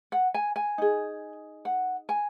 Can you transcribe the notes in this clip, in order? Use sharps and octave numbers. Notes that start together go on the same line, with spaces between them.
F#5
G#5
G#5
D#4 G#4
F#5
G#5